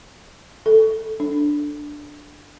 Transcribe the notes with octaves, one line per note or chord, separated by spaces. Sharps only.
A4
D4